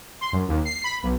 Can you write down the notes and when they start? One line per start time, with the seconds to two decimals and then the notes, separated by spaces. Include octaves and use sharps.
0.21 C6
0.32 F#2
0.48 D#2
0.65 C7
0.84 B5
1.03 B1